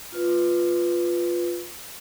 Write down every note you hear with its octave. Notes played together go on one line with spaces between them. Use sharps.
F4 B4